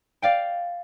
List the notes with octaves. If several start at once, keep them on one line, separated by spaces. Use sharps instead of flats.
D5 F5 G5